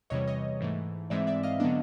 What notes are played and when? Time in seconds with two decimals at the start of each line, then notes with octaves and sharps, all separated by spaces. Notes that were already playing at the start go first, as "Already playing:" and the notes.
0.10 E2 C3 E3 G3 C#5 D#5
0.28 C#5 D#5
0.61 G#2 E3 A3
1.10 G#2 E3 G#3 C4 D5 E5
1.27 D5 E5
1.43 D#5 F5
1.60 D3 F#3 B3 D4